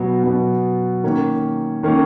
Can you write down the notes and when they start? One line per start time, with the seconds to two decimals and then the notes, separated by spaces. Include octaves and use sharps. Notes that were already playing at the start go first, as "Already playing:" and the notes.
Already playing: B2 F#3 B3
0.23 B2 F#3 B3
1.04 D#3 A#3 C#4
1.83 D#3 A#3 C#4